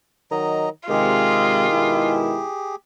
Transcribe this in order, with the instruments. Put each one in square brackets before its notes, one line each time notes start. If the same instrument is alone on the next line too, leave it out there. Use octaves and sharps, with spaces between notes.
[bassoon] D#3 [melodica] F#3 D#5 A#5
[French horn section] C3 G#3 [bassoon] D#3 [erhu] F4 [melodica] G4 G#4
[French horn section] B2 G#3 E4